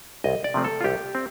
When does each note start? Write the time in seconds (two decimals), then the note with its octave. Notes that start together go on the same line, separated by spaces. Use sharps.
0.24 C2 D#5
0.44 D5
0.54 C3 F3 A3 C4
0.64 A4
0.81 F4
0.84 C2 G4
1.15 C4